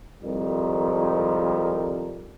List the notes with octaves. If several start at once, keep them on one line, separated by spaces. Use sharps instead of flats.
C2 F2 G#2 D#3 G3 A#4